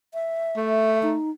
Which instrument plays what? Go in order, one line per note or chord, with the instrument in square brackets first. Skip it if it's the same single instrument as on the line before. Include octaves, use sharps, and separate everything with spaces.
[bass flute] E5
[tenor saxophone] A3
[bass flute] D#4